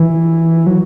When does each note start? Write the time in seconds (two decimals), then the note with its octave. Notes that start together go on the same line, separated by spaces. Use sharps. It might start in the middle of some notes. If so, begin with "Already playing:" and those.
Already playing: E3
0.67 F#3